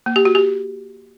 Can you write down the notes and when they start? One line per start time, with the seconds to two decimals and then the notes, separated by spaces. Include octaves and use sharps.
0.06 A#3
0.16 G4
0.25 F#4
0.35 G4